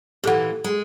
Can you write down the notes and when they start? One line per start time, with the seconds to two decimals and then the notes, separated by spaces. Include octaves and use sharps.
0.24 A#2 E3 G4 A4 F#5
0.64 G#3